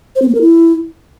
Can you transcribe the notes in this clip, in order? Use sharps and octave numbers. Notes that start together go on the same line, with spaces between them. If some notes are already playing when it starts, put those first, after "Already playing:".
C5
C4
A#3
A#4
E4